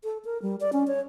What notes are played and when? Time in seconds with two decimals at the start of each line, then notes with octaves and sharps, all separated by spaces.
0.04 A4
0.25 A#4
0.42 G3
0.60 D5
0.73 C#4
0.88 C#5